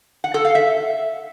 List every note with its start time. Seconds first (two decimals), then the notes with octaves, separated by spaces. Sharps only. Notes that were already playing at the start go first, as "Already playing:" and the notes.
0.24 F#5
0.34 A4
0.45 F5
0.55 E5